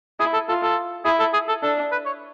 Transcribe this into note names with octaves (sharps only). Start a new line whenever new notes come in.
E4 G#4
A4
F4 A4
A4
E4 G#4
A4
G#4
A4
D4 A4
B4
C#5